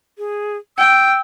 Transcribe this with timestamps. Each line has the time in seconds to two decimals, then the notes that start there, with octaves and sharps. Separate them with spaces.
0.18 G#4
0.78 G5 E6